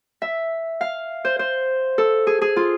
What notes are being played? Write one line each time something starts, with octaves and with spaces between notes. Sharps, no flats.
E5
F5
C5
C5
A4
G#4
G#4
F4